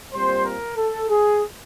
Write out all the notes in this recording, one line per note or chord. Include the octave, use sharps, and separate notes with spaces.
A#2 G3 C4 C5
A#4
A4
G#4